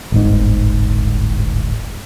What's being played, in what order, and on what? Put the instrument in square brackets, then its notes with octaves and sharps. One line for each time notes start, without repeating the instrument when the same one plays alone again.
[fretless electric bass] D1 G1 G#2